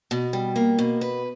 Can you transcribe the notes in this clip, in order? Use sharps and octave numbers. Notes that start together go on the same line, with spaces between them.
B2
G3
A#3
B2
B4